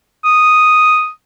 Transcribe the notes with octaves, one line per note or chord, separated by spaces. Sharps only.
D#6